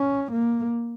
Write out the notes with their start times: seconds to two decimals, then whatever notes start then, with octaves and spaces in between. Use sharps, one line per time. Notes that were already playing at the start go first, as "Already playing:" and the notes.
Already playing: C#4
0.32 A#3